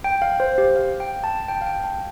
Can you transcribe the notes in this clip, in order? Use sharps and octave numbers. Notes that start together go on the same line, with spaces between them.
G5
F5
C5
G4
F5
G5
A5
G5
F5
G5
A5